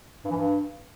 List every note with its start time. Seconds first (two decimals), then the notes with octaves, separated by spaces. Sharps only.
0.25 G2
0.31 E3
0.37 G2